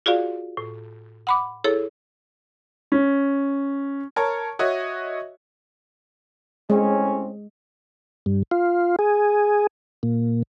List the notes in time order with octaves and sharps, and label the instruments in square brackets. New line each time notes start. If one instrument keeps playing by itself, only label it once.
[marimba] F4 F#4 G#4 D5 F5
A2
F#5 B5 D6
E4 G#4 A4 C#5
[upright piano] C#4
A#4 C#5 A5 C#6
F#4 C#5 D#5 E5
[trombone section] A2 C4 C#4 [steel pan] G#3
[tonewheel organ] G2
F4
G#4
A#2